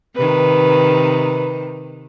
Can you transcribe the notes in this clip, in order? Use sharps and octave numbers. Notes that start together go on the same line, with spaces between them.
C3 D#3 B4